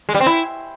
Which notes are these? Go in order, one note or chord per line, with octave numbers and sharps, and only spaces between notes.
G#3
G3
C4
E4